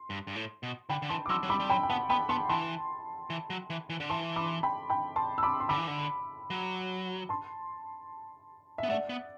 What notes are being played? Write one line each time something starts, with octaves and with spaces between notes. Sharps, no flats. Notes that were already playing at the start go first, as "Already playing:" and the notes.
Already playing: C6
G2
G2
A2
B2
D3 G5 B5
D3
E3 A5 C6
D6
F#3 C6 E6
F#3
G3 B5 D6
G3
F#3 G5 B5
G5
B3 F#5 A5
B3 G5 B5
B3 A5 C6
E3 A5 C6
E3
F#3
E3
E3
D3
E3 A5 C6
B5 D6
G5 B5
G5 B5
A5 C6
E6
B5 D6
C6
D3 B5 D6
E3
D3
F#3
A5 C6
B3 E5
A3 D5 F#5
B3